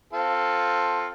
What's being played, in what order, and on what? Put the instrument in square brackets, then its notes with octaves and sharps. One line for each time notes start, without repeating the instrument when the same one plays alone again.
[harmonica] C4 F4 A4